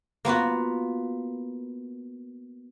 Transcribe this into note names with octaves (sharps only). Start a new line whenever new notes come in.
A#3 B3 F4 F#4